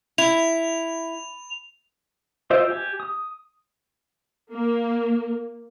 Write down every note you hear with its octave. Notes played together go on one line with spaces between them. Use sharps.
E4 F7
F4 C5 D#5 E5 G5
G4 G#5
D#6
A#3